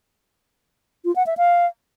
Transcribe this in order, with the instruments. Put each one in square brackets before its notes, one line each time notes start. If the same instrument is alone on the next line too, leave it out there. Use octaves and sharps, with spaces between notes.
[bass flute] F4
F#5
E5
F5